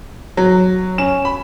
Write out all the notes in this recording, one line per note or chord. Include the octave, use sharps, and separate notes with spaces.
F#3
C#4 E7
B5